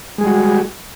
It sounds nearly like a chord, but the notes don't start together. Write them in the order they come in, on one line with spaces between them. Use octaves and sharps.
G#3 G#4 G3 F#4